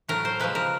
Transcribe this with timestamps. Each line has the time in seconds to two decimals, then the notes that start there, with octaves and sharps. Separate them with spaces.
0.08 A2 F#3 A3 A#4
0.25 C5
0.40 C#3 F3 G#3 B4
0.55 A#4